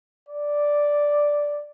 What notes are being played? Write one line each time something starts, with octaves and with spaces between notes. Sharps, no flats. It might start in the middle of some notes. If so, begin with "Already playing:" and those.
D5